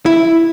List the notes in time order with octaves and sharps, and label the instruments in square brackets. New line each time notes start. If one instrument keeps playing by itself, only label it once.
[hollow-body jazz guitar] E4